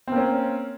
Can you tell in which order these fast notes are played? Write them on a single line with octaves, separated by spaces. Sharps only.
C4 A#3 C#4